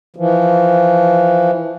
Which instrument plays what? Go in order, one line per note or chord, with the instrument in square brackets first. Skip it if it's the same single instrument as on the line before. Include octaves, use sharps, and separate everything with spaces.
[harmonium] E3 F3